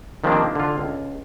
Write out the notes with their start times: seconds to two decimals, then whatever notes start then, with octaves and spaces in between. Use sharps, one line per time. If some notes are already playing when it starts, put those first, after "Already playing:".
0.24 D#3 F3 G3 A#3 C4 D4
0.55 D3 F4
0.78 C#2